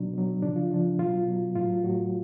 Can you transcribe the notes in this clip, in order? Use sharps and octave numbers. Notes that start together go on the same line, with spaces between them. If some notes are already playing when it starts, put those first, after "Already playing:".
Already playing: B2 F#3 D4
B2 F#3
C#3 F3 D4
F4
C#3 F3 D4
B2 F#3 F4
B2 F#3
A2 F#3 F4
A2 F#3 F#4